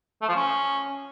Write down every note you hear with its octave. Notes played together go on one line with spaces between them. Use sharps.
A3
F3
C#4